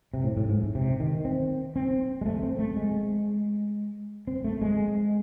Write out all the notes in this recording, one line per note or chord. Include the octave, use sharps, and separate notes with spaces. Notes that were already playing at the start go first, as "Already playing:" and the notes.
C3
A2
A2
G#2
C3
D#3
C4
C4
G#3
A3
C4
A3
G#3
C4
A3
G#3